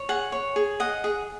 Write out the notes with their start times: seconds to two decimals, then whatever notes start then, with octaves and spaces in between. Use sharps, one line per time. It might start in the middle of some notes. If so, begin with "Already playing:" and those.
Already playing: C#5
0.09 G#4 F#5
0.32 C#5
0.56 G#4
0.80 D#5 F#5
1.04 G#4